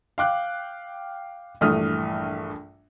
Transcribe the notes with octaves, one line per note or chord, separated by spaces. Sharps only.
F5 G5 D6 F#6
A#1 G2 E3 A3 D#6 F6